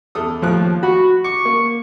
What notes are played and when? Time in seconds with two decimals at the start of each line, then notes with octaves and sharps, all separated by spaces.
0.15 E2 A4 D#6
0.42 D#2 A2 F3 F#6
0.83 F#4 B5
1.24 C#6 D6
1.45 A#3